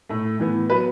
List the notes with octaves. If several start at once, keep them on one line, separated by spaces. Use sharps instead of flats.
A2 A3
A2 E3 B3
F#3 B3 B4